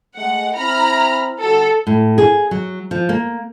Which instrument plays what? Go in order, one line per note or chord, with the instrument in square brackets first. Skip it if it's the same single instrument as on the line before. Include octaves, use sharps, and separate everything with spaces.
[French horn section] G#3 A3 [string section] F#5
[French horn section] C4 E4 [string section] A#5 B5 F6
[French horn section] D3 G3 F#4 [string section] A4
[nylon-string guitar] A2
G#4
F#3
F3
A#3